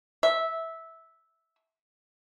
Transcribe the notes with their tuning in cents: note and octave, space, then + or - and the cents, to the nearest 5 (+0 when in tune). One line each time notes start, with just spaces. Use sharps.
E5 -10